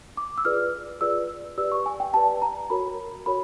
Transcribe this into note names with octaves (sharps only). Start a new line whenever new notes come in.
D6
E6
F4 G#4 B4 D5 F6
F4 G#4 B4 D5 E6
G4 B4 D5 E6
C#6
G#5
G5
G4 B4 D5 A5
A#5
F#4 A#4 C#5 B5
F#4 A#4 C#5 B5